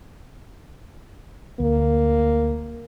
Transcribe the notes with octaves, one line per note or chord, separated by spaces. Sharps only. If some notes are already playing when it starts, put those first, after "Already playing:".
D2 A#3